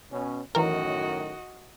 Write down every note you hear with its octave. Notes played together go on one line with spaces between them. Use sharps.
B2 C#4
F#2 A2 D#3 E3 F#4 A#4 D#5